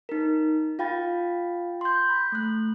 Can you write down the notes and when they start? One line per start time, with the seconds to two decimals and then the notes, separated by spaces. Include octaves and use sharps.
0.09 D#4 A#4
0.79 F4 F5 G5 B5 A6
1.81 C6 G6
2.10 B5
2.32 A3 F#6